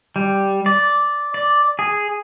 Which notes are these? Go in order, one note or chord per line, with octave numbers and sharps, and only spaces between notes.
G3
D5
D5
G#4